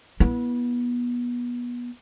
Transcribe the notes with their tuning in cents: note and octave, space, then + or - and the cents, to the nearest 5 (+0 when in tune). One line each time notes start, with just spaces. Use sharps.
B3 -25 E4 +0